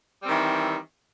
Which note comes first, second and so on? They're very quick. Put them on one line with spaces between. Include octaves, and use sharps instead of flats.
G3 C4 D#3 E3